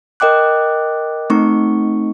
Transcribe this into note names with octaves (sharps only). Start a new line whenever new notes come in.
A#4 D#5 G5 D6 F#6
A3 C4 D#4 C#6